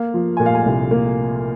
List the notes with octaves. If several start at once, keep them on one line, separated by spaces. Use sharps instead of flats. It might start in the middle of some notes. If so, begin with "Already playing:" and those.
Already playing: A#3 F5
F3
A#2 G#5
F5
G#5
C2
A#3